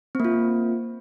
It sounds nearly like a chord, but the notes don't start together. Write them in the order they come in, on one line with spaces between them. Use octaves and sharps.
C4 A#3 F4